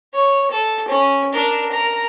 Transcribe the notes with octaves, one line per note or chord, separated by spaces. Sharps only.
C#5
A4
C#4
D4 A#4
A#4 A#5